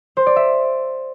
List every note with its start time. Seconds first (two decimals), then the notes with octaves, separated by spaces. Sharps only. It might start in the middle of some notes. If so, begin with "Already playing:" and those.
0.17 C5
0.26 D5
0.36 E5